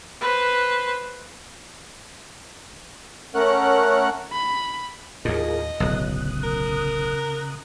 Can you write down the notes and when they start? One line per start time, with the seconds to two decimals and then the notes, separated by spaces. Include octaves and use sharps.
0.21 B4 C5
3.35 A3 C#4 A#4 F#5 F#6
4.32 B5
5.25 D#2 A2 F4 G#4 A#4 D#5
5.80 D1 B1 C#3 D#6 F#6
6.43 A#4